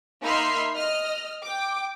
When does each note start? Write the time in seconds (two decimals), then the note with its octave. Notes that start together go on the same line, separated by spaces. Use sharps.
0.21 A#3 D#4 E5 B5 C6 F6
0.75 D#5 F6
1.42 G5 D6